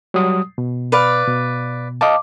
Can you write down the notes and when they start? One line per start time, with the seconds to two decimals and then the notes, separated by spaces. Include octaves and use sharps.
0.14 F#3 G3 D#6
0.58 B2
0.92 B4 D5 F5
1.28 B2
2.01 D#5 F5 A5 D6